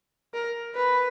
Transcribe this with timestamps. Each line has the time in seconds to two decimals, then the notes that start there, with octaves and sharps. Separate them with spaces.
0.34 A#4
0.75 B4